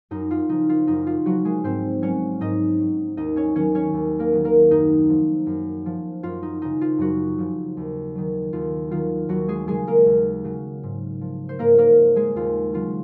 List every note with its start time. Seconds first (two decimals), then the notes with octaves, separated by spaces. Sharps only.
0.11 F#2 D#4
0.31 F4
0.49 C#3 F3 D#4
0.69 F4
0.87 F#2 D#4
1.07 F4
1.26 C#3 F3 F#3 F#4
1.45 G#3 G#4
1.64 G#2 C4 C5
2.02 F#3 C#4 C#5
2.41 G#2 D#4 D#5
2.80 F#3
3.17 D#2 D#4 D#5
3.36 C#4 C#5
3.55 D#3 F#3 C#4 C#5
3.75 C#4 C#5
3.94 D#2
4.19 A#3 A#4
4.33 D#3 F#3
4.44 A#3 A#4
4.70 F#2 D#4
5.09 F3
5.46 F#2
5.86 F3
6.23 F#2 F4
6.42 D#4
6.62 C#3 F3 D#4
6.81 F4
6.98 F#2 F#3 F#4
7.38 C#3 F3
7.77 D#2
8.15 D#3 F#3
8.53 D#2 F4
8.91 D#3 F#3 F4
9.29 D#2 F#3 F#4
9.48 G#3 G#4
9.67 C#3 F#3 G#3 G#4
9.87 A#3 A#4
10.06 D#2
10.44 C#3 F#3
10.83 G#2
11.21 F3
11.49 C5
11.59 G#2 A#3 A#4
11.78 A#3 A#4
11.98 F3
12.16 G#3 G#4
12.36 D#2 F4
12.74 C#3 F#3 F4